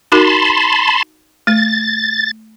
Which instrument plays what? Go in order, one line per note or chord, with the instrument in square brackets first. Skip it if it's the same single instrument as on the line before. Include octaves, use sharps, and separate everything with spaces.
[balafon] D#4 F#4 A#4 [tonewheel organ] A5 B5 C6
[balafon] A3 [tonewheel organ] A6